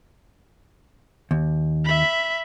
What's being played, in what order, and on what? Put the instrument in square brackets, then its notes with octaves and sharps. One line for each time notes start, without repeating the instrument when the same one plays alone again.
[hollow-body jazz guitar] D#2
[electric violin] E5 B5